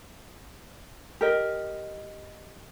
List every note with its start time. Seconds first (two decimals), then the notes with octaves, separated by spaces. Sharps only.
1.21 G4 A#4 D#5